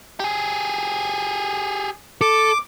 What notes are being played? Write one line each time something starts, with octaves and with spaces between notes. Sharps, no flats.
G4 G#4
A4 D6